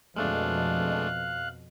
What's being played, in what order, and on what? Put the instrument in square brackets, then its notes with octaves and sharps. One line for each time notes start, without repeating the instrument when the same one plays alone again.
[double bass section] F2 B2 [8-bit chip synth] G#3 A3 D4 [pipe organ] F5 F#6